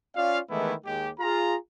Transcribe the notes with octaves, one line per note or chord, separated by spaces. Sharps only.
C#4 F4 D5 F5
D#3 E3 G#3 A3 B3 E4
D#2 G#3 G4
F4 G#4 A#5